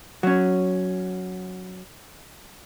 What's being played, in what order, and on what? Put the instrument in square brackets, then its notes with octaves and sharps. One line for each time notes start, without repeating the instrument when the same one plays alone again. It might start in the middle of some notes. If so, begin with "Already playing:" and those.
[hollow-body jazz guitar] F#3 C#4